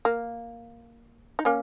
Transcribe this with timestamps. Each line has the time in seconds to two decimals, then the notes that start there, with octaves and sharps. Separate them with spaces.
0.05 A#3
1.39 D#4
1.45 A#3 C#4